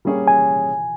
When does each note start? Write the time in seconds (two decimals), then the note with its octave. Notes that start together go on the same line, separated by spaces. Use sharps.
0.05 G3 A#3 C#4 G#4 C#5
0.28 G#5